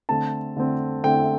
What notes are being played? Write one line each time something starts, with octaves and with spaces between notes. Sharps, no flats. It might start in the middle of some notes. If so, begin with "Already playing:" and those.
D3 A3 C4 A5
D3 A3 C4
D3 A3 C4 G5